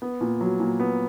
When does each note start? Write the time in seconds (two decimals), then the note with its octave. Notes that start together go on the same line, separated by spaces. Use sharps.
0.02 B3
0.21 A#2
0.41 F#3
0.60 A#2
0.80 B3